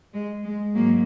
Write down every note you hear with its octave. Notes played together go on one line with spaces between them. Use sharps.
G#3
G#3
G#2 F#3 A#3